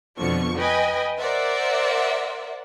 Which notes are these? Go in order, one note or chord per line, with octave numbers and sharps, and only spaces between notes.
F2 B2 D3 F3 C#6
B4 D#5 G5 G#5
A#4 C5 D5 E5 F#5